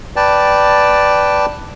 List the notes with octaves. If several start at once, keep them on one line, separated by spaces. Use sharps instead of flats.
B4 D5 G5 A5